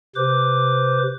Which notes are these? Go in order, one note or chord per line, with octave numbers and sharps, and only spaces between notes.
C3 B4 C5 D6